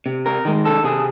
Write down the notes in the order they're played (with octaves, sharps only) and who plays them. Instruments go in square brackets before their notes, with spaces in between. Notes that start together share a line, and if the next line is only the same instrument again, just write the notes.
[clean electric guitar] C3
A#4
D#3 G#3
A4
C3 G#4